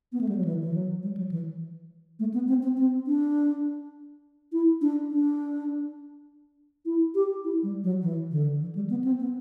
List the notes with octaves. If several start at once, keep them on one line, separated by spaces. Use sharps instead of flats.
B3
A3
G3
F#3
E3
E3
F#3
G3
F#3
E3
A3
B3
C4
C4
C4
D4
E4
D4
D4
E4
G4
E4
G3
F#3
E3
D3
E3
G3
B3
C4
B3